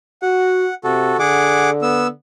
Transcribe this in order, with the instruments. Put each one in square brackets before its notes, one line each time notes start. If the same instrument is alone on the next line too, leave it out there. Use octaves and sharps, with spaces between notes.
[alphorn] F#4 [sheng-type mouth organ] F#5
[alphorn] C3 [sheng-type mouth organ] F#4 A4
[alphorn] D3 [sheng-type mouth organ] G#4 F#5 D6
[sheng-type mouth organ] B3 E6